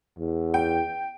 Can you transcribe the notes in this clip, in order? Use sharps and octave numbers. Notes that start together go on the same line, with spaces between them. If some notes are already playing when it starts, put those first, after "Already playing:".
E2
G5